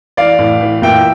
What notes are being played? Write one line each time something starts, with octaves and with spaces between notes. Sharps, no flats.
E3 D5 F5
A2
E3
A#2 E5 G5